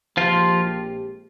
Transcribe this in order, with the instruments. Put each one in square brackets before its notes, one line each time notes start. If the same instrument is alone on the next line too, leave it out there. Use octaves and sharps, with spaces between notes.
[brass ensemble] A#1 A#2 G#3 C4 G4 [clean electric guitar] F3 F4